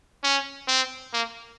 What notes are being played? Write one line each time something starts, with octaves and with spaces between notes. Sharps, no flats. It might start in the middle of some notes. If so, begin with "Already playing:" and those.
C#4
C4
A#3